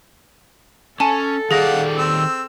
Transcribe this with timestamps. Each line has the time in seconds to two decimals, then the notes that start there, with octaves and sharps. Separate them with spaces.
1.00 C#4 A4 G#5 A5
1.51 D#3 G4 G#4 D5 F5 F#5 A#6
1.97 C4 E6